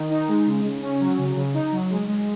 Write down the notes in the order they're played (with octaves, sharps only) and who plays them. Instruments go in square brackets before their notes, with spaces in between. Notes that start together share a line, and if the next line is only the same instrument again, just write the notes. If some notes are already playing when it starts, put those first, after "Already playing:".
Already playing: [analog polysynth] D#3
D#4
G#3
C#3
C#3
C#4
F#3
C#3
C#3
D#4
F#3
G#3
G#3